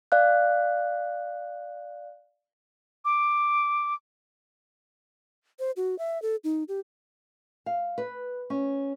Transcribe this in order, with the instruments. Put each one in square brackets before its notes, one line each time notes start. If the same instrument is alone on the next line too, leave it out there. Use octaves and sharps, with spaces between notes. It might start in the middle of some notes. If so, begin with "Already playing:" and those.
[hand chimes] D5 F5 F#6
[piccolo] D6
[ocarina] C5
F#4
E5
A4
D#4
G4
[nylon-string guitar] F5
B4
C#4